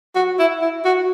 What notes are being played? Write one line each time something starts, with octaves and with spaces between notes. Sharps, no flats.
F#4
E4
E4
F#4